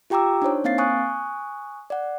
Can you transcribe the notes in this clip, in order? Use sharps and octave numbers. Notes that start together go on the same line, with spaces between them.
F4 G4 G5 A#5 D6 E6
D4 D#4 C5 C#5
A#3 C4 F5 A6 C7
G#5 C#6 D#6 F#6
D5 F#5